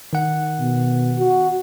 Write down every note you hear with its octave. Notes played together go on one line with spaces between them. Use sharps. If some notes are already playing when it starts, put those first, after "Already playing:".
D#3 F#5
B2
F#4